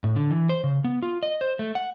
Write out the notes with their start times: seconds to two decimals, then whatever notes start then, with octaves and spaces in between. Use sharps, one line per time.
0.04 A2
0.16 D3
0.31 E3
0.49 C5
0.64 C#3
0.84 B3
1.02 F4
1.23 D#5
1.41 C5
1.59 A3
1.75 F#5